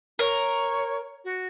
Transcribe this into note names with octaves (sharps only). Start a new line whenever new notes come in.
A#4 C#5
F#4